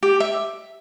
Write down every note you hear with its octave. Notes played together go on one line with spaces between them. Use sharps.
G4
E5